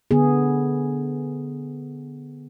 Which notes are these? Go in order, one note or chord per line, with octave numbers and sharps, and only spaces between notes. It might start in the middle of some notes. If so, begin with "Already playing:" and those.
D3 B3 G#4